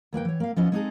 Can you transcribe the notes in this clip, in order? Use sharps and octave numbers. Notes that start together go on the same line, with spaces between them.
D#2 A#3 B4 G5
E3 C#5
A#3 F5
F3 B3 C#4 E4 D#5
G#3 C4 D#4 F#4 G#4 A4